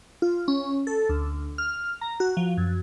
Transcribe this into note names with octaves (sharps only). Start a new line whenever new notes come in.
F4
C#4
A4
D2
F6
A#5
F#4
F3
F#2